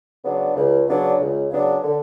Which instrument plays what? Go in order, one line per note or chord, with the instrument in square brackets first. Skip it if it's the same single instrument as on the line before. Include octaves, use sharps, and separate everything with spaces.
[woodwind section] C#3 F#3 B3 D4
C#2
C#3 F#3 B3 D4
C#2
C#3 F#3 B3 D4
D3